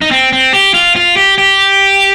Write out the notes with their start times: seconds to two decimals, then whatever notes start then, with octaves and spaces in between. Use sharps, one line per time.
0.01 D#4
0.11 C4
0.33 C4
0.53 G4
0.74 F4
0.96 F4
1.16 G4
1.38 G4